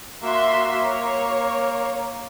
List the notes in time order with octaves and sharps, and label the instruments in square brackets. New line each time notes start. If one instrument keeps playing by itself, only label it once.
[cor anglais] A#3 [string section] F#4 E5 C6
[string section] C#5